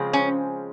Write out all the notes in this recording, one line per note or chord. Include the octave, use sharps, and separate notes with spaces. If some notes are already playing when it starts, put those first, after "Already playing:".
Already playing: C#3 F3 G#3 C4
C#4